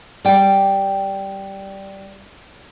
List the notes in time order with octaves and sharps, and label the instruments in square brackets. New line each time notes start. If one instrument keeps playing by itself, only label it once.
[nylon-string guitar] G3 D5 G5